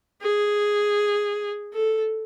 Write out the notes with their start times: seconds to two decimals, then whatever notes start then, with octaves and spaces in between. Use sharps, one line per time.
0.23 G#4
1.74 A4